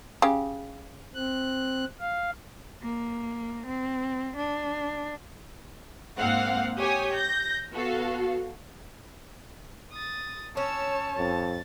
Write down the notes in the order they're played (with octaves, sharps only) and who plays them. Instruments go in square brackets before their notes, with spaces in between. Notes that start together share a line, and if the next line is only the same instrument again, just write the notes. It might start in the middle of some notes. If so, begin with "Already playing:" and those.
[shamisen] C#3 G4
[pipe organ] C4 F#6
F5
[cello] A#3
C4
D4
[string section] G#2 A#3 C4 F5 F#5
G4 C#5 G#5 D#6
G6 A#6
B3 F#4 A4 F5
[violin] D#6 A6
[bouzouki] C#4 [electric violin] C#5 A5 [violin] E6
[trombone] F2 [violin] A6